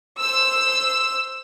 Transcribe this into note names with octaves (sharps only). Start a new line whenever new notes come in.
C5 E6